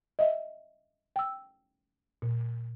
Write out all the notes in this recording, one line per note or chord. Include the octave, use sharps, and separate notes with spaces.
D#5 E5
G5 E6
A#2